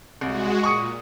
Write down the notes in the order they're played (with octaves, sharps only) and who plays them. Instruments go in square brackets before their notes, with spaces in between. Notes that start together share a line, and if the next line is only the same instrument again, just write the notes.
[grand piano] C2 [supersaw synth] G#3 F#4
[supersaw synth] A#2 [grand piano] C#6 D#6 C#7